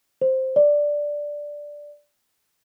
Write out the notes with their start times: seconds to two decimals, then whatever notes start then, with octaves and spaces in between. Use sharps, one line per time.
0.22 C5
0.56 D5